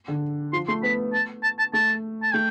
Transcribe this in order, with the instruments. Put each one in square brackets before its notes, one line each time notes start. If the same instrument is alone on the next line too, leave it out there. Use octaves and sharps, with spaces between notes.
[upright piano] D3
[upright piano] F3 [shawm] C6
[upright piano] A3 [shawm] C6
[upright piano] B3 [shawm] B5
[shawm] A5
A5
A5
[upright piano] A3 [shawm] A5
[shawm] A5
[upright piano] A3 [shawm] G5